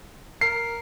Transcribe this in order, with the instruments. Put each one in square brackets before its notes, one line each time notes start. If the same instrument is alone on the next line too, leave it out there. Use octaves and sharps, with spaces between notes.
[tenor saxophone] A#4 [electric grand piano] C7